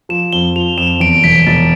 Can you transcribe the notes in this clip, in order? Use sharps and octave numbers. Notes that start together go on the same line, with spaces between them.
F3 E7
F2 G7
F3 F7
F2 E7
E2 D7
E1 B6
E1 A6